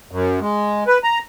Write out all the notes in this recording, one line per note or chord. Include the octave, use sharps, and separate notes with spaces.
F#2
G#3
B4
A#5